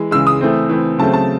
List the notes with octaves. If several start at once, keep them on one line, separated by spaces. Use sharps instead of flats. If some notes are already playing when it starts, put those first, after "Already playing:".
Already playing: E3 G#3
C#3 E3 G#3 E6
D#6
E3 A3 C4
E3 A3 C4
C#3 F#3 A3 C4 A5
A5